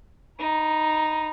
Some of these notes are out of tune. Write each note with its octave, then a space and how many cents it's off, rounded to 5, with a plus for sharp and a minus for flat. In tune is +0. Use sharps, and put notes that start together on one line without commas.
D#4 -5 B5 -30